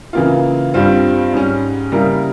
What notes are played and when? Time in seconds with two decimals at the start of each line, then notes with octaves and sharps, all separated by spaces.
0.13 C#3 E3 A#3 F4
0.74 G2 G3 C4 F4
1.33 G#2 G3 C#4
1.92 C#3 G3 A#3 E4 A#4